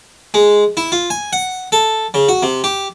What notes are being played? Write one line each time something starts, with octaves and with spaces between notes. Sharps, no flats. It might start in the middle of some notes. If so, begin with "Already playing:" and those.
G#3
E4
F4
G#5
F#5
A4
C#3
F#4
C3
G4